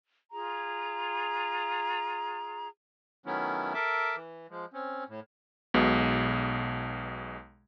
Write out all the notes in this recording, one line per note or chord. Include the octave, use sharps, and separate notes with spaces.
F4 G#4 A#5
D#3 F#3 A3 B3 C#4 E4
A4 A#4 E5 D6
E3
F3 G#3
C4 C#4
A2
B1 B2 G#3